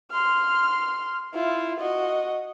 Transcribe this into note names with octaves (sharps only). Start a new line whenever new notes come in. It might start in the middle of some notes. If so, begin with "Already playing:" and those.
C6 F6
E4 F4
F#4 D#5